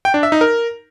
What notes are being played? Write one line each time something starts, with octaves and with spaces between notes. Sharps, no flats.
G5
D4
E5
D#4
A#4